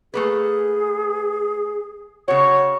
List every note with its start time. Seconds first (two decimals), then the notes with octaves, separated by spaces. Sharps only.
0.14 A3 A#3 G#4 B4
2.28 C#3 F#4 C#5